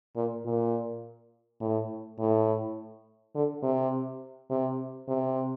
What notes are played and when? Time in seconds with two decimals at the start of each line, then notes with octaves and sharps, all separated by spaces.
0.16 A#2
0.45 A#2
1.61 A2
2.19 A2
3.35 D3
3.63 C3
4.50 C3
5.08 C3